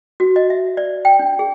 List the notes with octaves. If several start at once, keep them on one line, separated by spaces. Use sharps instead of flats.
F#4
D#5
E5
D5
G5
D4
G#4